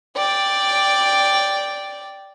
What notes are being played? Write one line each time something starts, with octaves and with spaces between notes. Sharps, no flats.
D5 G5